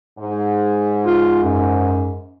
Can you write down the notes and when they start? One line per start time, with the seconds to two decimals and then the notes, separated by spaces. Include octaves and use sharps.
0.19 G#2
1.06 F4
1.43 F#2